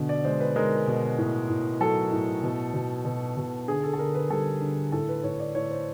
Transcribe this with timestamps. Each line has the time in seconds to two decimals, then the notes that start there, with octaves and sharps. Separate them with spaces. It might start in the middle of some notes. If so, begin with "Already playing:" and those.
Already playing: B2 D3
0.09 D5
0.24 G#3 C5
0.40 B4
0.56 G#3 A#4
0.87 B2
1.18 A2
1.49 A2
1.80 F#3 A4
2.12 A2
2.43 B2
2.74 B2
3.05 B2
3.37 B2
3.68 D3 G#4
3.83 A4
3.94 A4
3.99 D3 A#4
4.14 B4
4.30 G3 A4
4.61 D3
4.92 A2 A4
5.08 B4
5.23 A2 C#5
5.40 D5
5.55 A2 C#5
5.71 C5